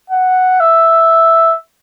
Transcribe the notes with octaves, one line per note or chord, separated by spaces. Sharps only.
F#5
E5